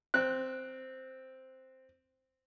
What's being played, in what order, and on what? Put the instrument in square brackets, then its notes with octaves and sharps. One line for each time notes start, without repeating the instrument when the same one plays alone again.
[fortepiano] C4 F#6